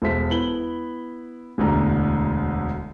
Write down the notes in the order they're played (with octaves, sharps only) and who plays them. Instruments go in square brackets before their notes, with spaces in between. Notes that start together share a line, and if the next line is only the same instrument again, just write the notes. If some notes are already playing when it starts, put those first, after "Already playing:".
[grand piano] E1 A4 C5 E5 B6
B3 E4 F#7 G7
E1 D2 D3 A#5